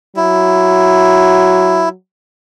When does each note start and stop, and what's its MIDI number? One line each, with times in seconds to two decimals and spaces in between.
0.16 1.93 54
0.16 1.89 64